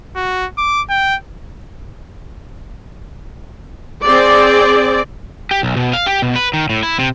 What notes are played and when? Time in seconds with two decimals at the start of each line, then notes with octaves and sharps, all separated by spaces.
0.16 F#4
0.58 D6
0.89 G5
4.05 C4 G#4 D5
5.51 G4
5.63 B1
5.77 B2
5.93 F5
6.06 G4
6.22 B2
6.36 B4
6.53 D#3
6.70 A2
6.83 E4
6.99 C3